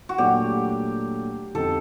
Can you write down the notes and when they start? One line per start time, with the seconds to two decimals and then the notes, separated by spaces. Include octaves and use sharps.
0.09 F#4
0.18 A#2 F#3 A3 D4 G4
1.54 F2 D3 G3 C4 D#4 A4